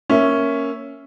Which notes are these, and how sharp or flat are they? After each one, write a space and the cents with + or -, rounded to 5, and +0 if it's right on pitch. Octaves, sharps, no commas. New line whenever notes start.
A#3 +0 C#4 +0 E5 +0